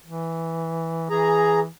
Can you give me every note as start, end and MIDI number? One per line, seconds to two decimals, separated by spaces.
0.06 1.06 52
1.10 1.67 52
1.10 1.59 68
1.10 1.59 82